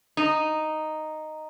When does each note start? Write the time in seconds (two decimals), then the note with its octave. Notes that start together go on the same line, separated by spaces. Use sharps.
0.17 D#4